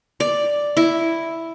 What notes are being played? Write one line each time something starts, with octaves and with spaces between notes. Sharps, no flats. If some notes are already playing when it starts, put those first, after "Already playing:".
D5
E4